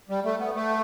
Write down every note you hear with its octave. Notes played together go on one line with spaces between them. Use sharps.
G3
A3
B3
A3